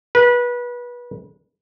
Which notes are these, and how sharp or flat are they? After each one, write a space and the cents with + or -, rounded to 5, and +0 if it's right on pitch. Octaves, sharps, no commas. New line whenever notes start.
B4 -25